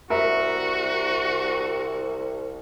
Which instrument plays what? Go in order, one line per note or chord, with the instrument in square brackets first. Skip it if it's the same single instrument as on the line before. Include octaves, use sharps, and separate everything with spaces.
[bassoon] C2 [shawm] F#4 [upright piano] A#4 E5